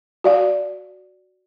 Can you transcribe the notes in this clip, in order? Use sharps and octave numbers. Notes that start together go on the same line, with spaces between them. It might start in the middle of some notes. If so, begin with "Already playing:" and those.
F#4 D5 F5